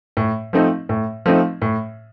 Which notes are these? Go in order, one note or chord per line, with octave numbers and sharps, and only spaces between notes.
A2
F3 A3 C4 D#4
A2
F3 A3 C4 D#4
A2